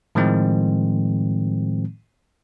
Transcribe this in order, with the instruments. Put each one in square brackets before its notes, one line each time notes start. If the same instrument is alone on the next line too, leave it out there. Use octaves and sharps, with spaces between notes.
[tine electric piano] A2 D#3 F3 G#3 C4